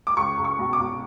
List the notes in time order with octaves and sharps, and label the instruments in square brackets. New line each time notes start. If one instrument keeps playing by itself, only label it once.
[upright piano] D6
C#2 C#6
C#2
C#6
B2
D6
B2